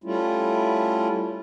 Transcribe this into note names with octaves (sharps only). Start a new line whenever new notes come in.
G3 A3 C#4 E4 F4